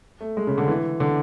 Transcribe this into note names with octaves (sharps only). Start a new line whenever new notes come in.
A3
G#3
C#3
D3
E3
D3